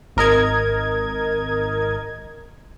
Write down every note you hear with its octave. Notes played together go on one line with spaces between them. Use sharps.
G#1 A#4 D#5 G#6